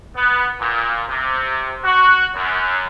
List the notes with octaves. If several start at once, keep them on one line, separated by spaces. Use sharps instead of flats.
B3
A#2
C3
F#4
F#2